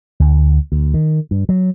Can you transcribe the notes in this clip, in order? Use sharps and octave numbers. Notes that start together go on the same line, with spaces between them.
D2
D2
D#3
G2
F#3